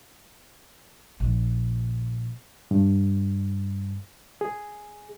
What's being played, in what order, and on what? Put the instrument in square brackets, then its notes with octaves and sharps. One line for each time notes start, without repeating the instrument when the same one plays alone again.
[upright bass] A#1
[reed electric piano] G2
G#4